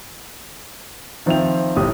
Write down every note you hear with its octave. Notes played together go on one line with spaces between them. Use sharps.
D#3 F3 C4 E5 G5 F7
G1 A2 G4 D#6